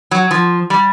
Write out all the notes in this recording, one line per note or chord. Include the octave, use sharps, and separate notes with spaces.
F#3
F3
G3